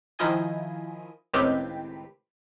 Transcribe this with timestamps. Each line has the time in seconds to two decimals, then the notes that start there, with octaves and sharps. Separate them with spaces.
0.19 D#3 F3 E4 F4 D#5 G#5
1.34 C#2 A2 D#3 C4 G4 B4